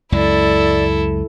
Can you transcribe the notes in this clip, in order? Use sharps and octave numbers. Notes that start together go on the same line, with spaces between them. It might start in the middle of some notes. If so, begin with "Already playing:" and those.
C#2 F#2 G#3 E4 A4 D5